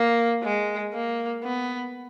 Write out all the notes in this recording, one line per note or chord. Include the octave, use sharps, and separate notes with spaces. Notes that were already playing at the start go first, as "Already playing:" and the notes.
Already playing: A#3
G#3
A#3
B3